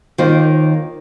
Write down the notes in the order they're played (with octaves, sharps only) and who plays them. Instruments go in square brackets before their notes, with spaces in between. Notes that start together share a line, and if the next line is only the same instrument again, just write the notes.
[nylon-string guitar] D#2 D#3 A#3 F4 C5